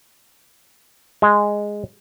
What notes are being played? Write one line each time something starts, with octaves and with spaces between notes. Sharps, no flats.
G#3